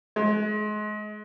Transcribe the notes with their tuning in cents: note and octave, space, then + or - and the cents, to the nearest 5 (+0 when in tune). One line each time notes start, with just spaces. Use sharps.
G#3 +30